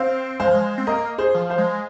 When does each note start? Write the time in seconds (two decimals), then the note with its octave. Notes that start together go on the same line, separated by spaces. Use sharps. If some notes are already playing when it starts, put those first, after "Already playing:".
Already playing: C4 C5 F5
0.40 G#3 C5 F5
0.48 F3
0.54 G#3
0.78 C4
0.87 A#3 A#4 D#5
1.18 G#4 C5
1.35 F3
1.50 C5 F5
1.58 G#3